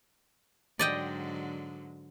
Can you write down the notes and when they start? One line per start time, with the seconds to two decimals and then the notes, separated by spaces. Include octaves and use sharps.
0.79 G#2 D3 F#3 D5 D#5 G5